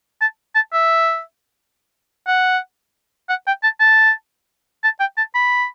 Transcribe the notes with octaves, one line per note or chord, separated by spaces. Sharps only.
A5
A5
E5
F#5
F#5
G5
A5
A5
A5
G5
A5
B5